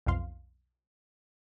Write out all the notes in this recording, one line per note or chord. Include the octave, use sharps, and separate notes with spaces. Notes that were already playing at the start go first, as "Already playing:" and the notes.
B1 F2 F3 F5 C6